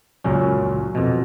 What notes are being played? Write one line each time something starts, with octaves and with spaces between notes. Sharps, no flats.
C#2 F#2 A#2 C#4
F2 B2